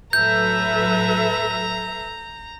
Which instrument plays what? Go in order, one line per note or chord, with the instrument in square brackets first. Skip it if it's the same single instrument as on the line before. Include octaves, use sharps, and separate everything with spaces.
[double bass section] A2 F#3 [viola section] A4 B4 E5 [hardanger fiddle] A#5 [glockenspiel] G6